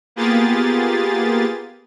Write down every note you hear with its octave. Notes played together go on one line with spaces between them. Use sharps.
A#3 B3 F4 G4 G#4 A6